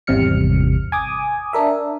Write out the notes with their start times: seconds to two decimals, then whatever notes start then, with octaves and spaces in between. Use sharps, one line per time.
0.07 G#1 E2 C3 G3 F6 C#7
0.92 G#5 D6 D#6
1.53 D4 A#4 E5